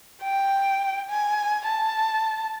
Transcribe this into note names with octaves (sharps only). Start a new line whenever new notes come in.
G5
G#5
A5